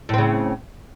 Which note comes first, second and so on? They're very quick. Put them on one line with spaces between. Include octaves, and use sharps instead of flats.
A2 C4 C#3